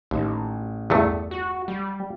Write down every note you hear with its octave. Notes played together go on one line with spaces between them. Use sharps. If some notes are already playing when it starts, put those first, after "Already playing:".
A1 D#2
E2 G2 A3
F#4
G3